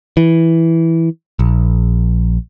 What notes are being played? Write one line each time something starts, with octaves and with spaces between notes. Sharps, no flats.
E3
A#1